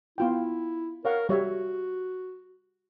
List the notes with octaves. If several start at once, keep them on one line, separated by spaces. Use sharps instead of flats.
B3 E4 F4 G5
A#4 C#5 F5 F#5
G3 F#4 C#5 E5